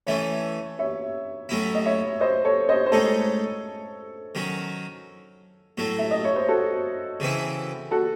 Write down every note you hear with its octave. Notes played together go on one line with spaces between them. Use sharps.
E3 A3 C#4 C#5 E5
C#5 E5
A2 F#3 C#4 E4
D#5
C#5 E5
C5 D#5
A4 C#5
C5 D#5
C5
A2 G#3 D#4 A4 C#5
D#3 F#3 C#4
A2 F#3 A3
E5
D#5
C#5
C5
F#4 A4
C#3 E3 C4 E4
F#4 A4